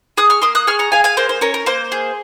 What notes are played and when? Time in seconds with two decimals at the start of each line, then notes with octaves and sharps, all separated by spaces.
0.17 G#4 D#6 F#6
0.30 C#6 F6
0.42 A#3 C6 D#6
0.55 D#6 F#6
0.67 G#4 C#6 F6
0.79 A#5 C#6
0.92 G#4 F5 G#5
1.04 F5 G#5
1.17 A#3 C5
1.29 C5
1.41 C#4 A#4 C#5
1.54 A#4
1.66 A#3 C5
1.92 G#4